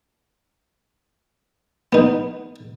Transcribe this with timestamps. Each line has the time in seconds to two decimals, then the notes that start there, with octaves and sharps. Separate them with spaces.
1.93 B3 D#4